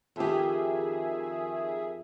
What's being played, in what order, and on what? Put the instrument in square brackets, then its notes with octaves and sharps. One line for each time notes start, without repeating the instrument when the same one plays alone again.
[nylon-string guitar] F2 G4 [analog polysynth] D#3 G#4 E5